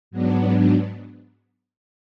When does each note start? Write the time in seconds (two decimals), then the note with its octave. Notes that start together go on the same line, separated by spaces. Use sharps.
0.11 G#2 F#3 B3 D4